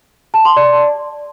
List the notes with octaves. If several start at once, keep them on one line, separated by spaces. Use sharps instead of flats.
A5
C6
D5